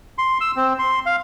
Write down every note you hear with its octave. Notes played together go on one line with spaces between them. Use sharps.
C6
E6
C4
C6
F5